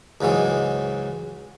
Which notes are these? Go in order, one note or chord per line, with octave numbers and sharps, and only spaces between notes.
C#2 G#2 E3 F#3 G#3